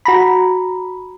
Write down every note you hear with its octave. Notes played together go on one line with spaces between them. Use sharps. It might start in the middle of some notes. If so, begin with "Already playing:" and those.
F#4 A#5 B5